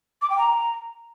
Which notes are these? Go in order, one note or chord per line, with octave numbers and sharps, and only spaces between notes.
D6
G5
A#5